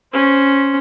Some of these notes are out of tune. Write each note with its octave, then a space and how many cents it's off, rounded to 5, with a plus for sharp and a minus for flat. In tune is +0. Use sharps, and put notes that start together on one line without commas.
C#4 +0 C5 +5